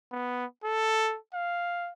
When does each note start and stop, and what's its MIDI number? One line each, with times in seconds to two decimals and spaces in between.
0.12 0.45 59
0.64 1.17 69
1.34 1.91 77